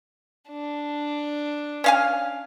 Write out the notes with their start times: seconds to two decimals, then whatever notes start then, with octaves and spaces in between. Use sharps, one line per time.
0.49 D4
1.84 C#4 F5 G#5